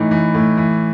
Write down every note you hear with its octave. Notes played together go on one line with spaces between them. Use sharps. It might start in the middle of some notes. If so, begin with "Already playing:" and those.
Already playing: A2 E3 D#4
E3
A2
E3